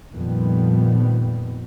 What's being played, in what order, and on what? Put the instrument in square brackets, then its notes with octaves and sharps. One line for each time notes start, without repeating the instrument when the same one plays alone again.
[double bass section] F2 A#2 D#3 F3 G3 B3